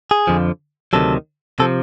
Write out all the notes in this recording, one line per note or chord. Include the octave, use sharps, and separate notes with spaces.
G#4
F2 D3 F3
D2 C3 D#3 F#3 A4
C3 F3 A4